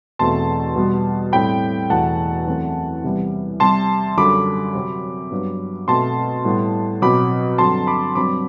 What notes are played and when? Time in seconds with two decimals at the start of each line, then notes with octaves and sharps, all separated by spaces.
0.19 E2 B2 A3 C4 A5 C6
0.76 B2 G3 B3
1.33 A2 G3 C4 G5 B5
1.90 E2 B2 A3 F#5 A5
2.46 F#2 E3 A3 C4
3.04 C3 E3 G3 B3
3.60 C3 G3 C4 A5 C6
4.17 F#2 D3 G3 B5 D6
4.75 C3 F#3 C4
5.31 G2 F#3 B3
5.88 B2 A3 C4 A5 C6
6.45 A2 G3 B3
7.02 B2 F#3 C4 B5 D6
7.58 G2 D3 F#3 C4 A5 C6
7.87 B5 D6
8.15 G2 F#3 C4 B5 D6